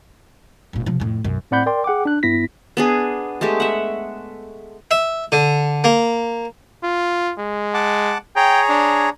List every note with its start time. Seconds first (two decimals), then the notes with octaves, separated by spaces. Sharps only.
0.73 G1 A#2
0.86 C3 F3
1.00 F2 A2
1.24 B1 F#2
1.51 A2 C4 D5 F#5 B5 G6
1.66 A#4 D5 G5 C6
1.84 G#4 F#5 G5 D6
2.05 D4 F#6
2.23 G2 B3 E4 A#6 B6
2.77 B3 D4 G#4
3.41 G#3 A3 G4
3.60 E5 F#5
4.91 E5
5.32 D3
5.84 A#3
6.83 F4
7.39 G#3
7.74 F#5 A5 D6
8.36 G#4 C#5 G5 A#5
8.69 D4